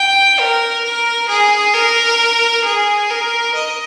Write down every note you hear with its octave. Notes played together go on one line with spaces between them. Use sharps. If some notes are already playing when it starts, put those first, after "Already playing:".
Already playing: G5
A#4
A#4
G#4
A#4
G#4
A#4
D#5